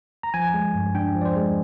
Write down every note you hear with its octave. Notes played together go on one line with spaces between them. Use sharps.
A#5
F3 G#5
G#3
G2
D4 G5
F3
D5
C5
G#3